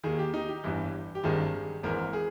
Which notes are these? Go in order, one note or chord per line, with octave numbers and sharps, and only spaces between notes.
D#2 D#3 G#4
G4
D#4
G4
G1 G2 E3
G4
G#1 G2 D#3 G#4
G#1 G#2 E3 A#4
G#4